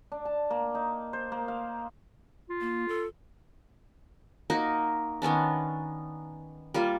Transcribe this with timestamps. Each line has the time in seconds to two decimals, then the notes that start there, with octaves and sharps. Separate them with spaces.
0.12 D4
0.25 A5
0.50 A#3
0.75 D#4
1.13 C5
1.32 A#3
1.48 F5
2.49 F4
2.61 A#3
2.88 A4
4.50 A#3 D#4 F#4
5.22 D#3 B3 C#4 D4
6.74 G3 A#3 F4